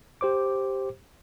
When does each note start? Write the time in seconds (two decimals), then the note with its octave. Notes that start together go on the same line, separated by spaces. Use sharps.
0.21 G4 C5 D6